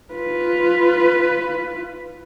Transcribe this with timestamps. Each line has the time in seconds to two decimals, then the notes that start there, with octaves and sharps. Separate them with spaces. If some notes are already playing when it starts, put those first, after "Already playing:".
0.14 F4 B4